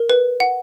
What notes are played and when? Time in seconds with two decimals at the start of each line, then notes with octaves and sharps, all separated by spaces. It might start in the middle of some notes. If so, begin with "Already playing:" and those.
Already playing: A#4
0.10 B4
0.40 F#5